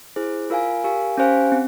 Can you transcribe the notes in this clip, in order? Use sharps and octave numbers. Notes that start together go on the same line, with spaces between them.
E4 G#4 C5
F4 A#4 F5 G#5
G4 A#4 F5 G#5
C#4 G4 C5 F5 G#5
C4